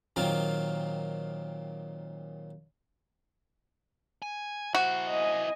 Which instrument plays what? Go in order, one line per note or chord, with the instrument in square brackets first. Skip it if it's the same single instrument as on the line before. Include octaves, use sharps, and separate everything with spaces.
[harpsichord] A#2 D#3 F#3 C4 F4
[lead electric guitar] G#5
[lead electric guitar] E4 C5 [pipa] F#4
[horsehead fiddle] D#5 G#5